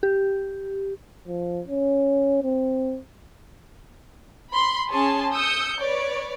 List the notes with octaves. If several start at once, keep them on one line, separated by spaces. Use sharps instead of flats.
G4
F3
C#4
C4
B5 C6
C#4 G#4 C#5 A5 C6
D#6 E6 G6 C#7
B4 C#5 D5